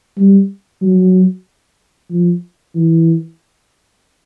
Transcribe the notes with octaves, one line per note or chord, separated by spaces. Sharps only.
G3
F#3
F3
E3